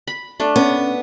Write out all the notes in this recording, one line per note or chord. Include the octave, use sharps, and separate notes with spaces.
B5
A3 D4
B3 C#4